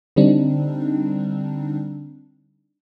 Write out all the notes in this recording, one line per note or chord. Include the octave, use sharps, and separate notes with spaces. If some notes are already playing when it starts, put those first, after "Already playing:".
D3 G3 C4 D4 D#4